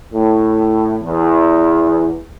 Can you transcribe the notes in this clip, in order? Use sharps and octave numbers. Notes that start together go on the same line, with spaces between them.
A2
E2